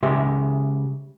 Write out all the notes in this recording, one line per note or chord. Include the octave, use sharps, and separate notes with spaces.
C#3 G#3 G4 E5 C6